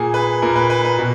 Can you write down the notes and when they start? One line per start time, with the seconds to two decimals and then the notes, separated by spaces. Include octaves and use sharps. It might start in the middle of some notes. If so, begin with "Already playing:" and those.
Already playing: A#2 G#4
0.14 B4
0.42 A#2 A#4
0.56 B4
0.70 B4
0.85 B4
0.98 B2